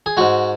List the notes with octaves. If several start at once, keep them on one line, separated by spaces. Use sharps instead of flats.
G#4
G#2 G#3 F#4